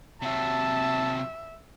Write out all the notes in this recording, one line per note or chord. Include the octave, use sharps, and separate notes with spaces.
C3 F#3 E5 A5